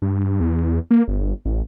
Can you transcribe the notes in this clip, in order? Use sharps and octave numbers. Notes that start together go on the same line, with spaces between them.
G2
E2
A#3
G1
A1